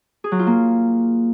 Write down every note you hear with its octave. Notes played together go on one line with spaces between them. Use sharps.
G#4
F#3
F4
A#3